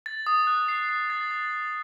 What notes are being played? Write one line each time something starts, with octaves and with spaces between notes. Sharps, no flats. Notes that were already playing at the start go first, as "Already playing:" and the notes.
A6
D#6
F#6
C7
D#6
A6
A6
A6